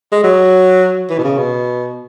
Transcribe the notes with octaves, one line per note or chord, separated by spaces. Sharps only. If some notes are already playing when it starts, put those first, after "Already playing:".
G#3
F#3
E3
B2
C#3
B2